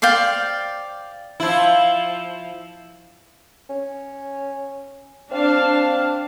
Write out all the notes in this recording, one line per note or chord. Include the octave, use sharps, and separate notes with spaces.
C5 D5 F5 G5
F3 E4
C#4
C4 D4 F5 A5